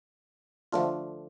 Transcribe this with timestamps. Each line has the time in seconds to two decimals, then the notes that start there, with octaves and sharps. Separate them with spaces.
0.72 D3 F3 A3 D4 F4